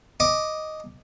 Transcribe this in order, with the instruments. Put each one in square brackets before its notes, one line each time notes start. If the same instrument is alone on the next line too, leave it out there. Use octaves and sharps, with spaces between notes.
[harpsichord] D#5 D6